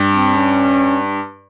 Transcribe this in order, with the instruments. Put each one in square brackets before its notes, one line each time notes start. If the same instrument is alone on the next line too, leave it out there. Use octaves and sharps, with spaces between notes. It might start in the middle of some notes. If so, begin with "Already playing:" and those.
Already playing: [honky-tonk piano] G2
[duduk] C4
C#4